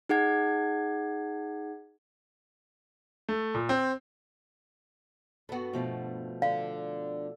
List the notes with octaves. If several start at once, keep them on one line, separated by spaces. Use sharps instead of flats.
D#4 G#4 F#5 G#6
A3
A#2
C4
G2 B3 F#4 A4
B2 F3 A3
D3 F5